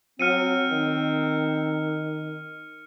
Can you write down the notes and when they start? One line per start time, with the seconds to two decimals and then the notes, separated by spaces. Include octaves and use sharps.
0.20 F#3 C4 F6 C#7 D#7
0.71 D#3